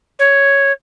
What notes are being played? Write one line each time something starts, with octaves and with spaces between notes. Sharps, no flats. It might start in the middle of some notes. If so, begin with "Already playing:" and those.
C#5